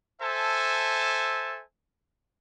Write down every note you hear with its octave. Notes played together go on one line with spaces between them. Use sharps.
A4 C5 E5 G#5 A5